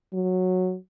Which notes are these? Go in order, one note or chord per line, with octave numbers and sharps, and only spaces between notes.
F#3